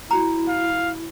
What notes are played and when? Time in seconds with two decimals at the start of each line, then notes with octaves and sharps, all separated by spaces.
0.11 E4 F#4 A#5
0.48 F5